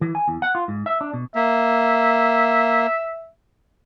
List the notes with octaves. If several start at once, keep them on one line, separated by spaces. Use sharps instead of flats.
E3
G#5
E2
F#5
F4
G#2
E5
D4
B2
A#3 E5